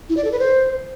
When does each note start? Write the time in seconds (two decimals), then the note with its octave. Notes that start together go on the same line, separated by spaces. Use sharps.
0.09 E4
0.17 D5
0.24 A4
0.32 B4
0.39 C5